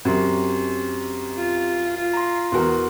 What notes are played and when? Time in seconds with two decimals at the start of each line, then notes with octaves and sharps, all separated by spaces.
0.05 F#2 C4 G4 C6
1.37 F4
1.96 F4
2.13 A#5 C6
2.52 E2 F#4 A#4 C6